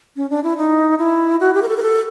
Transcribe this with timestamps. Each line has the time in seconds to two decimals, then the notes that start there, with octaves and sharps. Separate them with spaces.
0.16 C#4
0.30 D4
0.43 E4
0.57 D#4
0.99 E4
1.40 F#4
1.54 G4
1.62 A#4
1.68 A4
1.77 A#4
1.82 A4